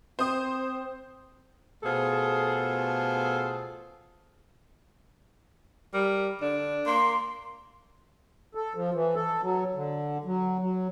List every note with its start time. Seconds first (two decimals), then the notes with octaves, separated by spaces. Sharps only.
0.19 C4 C5 D#6
1.83 B2 A3 F4 G#4 A4 C5
5.94 G3 A#4
6.42 D3 D4
6.86 A#3 C6
8.55 A4
8.75 F3
8.94 E3
9.15 A4
9.41 F#3
9.75 D3
10.25 F#3
10.59 F#3